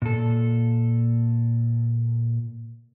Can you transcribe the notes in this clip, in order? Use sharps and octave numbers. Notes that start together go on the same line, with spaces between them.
A#2 A4